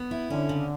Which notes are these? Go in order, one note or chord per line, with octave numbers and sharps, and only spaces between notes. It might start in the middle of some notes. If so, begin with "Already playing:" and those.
Already playing: B3
E4
D3 C#4
C#3